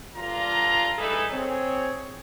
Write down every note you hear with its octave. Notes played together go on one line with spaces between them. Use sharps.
G1 A#2 D3 D4 F4 A#5
G2 E3 D#4 G#4 A4 B4
C4 G#4 C#5